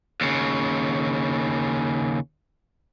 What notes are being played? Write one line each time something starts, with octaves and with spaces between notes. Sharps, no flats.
D#2 C#3